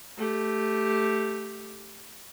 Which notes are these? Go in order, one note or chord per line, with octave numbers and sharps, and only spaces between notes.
A3 G4